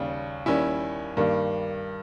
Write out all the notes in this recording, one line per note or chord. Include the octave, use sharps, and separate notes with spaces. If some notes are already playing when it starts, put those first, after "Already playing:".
Already playing: D#2 C#3 G3
D#2 D#3 G3 C#4 E4
G2 D#3 G3 A#3